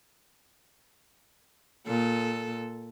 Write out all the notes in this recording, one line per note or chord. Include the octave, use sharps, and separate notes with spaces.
A#2 A4